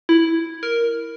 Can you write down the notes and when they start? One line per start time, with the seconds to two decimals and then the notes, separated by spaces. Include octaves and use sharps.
0.09 E4
0.63 A#4